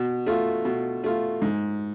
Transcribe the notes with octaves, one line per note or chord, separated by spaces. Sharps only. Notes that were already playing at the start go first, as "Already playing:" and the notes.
Already playing: B2
A3 F4
B2
A3 F4
G#2